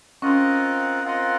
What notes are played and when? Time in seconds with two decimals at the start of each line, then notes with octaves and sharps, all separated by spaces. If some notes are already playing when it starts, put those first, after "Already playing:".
0.22 C4 C#4 F4 A#4 D#5 F#5
1.04 C4 F4 A#4 D#5 F#5